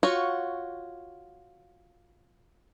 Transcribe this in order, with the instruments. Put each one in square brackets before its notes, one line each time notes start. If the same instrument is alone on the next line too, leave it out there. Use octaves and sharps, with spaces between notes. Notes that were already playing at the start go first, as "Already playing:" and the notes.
[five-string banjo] F4 F#4 C#5